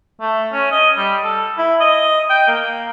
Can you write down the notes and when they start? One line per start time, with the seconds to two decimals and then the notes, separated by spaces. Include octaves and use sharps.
0.21 A3
0.52 C#4
0.72 D#5
0.97 G3
1.24 A4
1.58 E4
1.80 D#5
2.30 G5
2.48 A#3